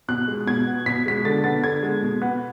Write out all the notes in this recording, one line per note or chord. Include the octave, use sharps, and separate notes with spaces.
B2 F#6
G#3
B2 G#6
B3
B2 B6
G#3 B6
D3 A6
B3 A6
D3 G#6
G#3
B2
B3